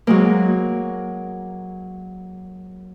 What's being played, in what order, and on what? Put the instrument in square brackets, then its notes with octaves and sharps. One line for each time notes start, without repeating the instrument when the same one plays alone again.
[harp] F#3 G#3 A#3